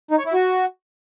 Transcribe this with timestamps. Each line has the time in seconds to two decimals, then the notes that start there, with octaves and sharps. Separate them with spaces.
0.11 D#4
0.18 C#5
0.26 E4
0.33 F#4